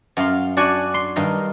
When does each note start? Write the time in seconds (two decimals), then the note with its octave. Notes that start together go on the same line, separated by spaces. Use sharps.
0.17 F#2 F5 C6
0.57 D4 F#4 D5 F#5 G#5
0.94 C6
1.16 G2 D#3 A#4